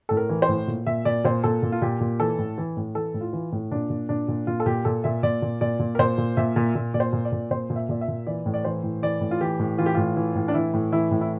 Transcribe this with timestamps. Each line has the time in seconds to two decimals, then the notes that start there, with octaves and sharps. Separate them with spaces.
0.09 A2 A4
0.17 A#4
0.29 E3
0.42 C5
0.49 A2
0.67 A#2
0.86 A#2 E5
1.05 A#2 D5
1.24 A#2 C5
1.44 A#2 A4
1.63 A#2
1.72 F4
1.82 A#2 G4
2.00 A#2
2.20 E3 A4
2.39 A2
2.58 E3
2.77 A2
2.95 E3 A4
3.14 A2
3.21 F4
3.33 E3
3.52 A2
3.71 A#2 D4
3.90 A#2
4.09 A#2 D4
4.28 A#2
4.47 A#2 F4
4.60 A4
4.66 A#2 G4
4.85 A#2 A4
5.04 A#2 E5
5.23 A#2 D5
5.42 A#2
5.61 A#2 D5
5.79 A#2
5.95 A#4
5.99 A#2 C5
6.18 A#2
6.37 A#2 E5
6.56 A#2
6.75 A#2
6.94 A#2 D5
7.00 C5
7.13 A#2
7.25 D5
7.32 A#2
7.51 A#2 C5
7.70 A#2
7.76 E5
7.89 A#2 D5
8.01 E5
8.08 A#2
8.27 E3 D5
8.46 A2
8.54 D5
8.65 E3 C5
8.83 A2
9.02 E3 D5
9.21 A2
9.31 F4
9.41 E3 G4
9.59 A2
9.78 E3 F4
9.86 G4
9.95 A2 F4
10.16 E3
10.35 A2
10.48 D4
10.54 E3 E4
10.74 A2
10.92 E3 E4
11.11 A2
11.21 E4